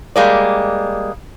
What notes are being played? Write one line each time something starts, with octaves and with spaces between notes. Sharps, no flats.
G3 G#3 A#3 D5